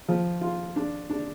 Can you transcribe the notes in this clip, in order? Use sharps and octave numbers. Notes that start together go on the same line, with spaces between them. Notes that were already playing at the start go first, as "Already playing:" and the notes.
F3
F4
D4
D4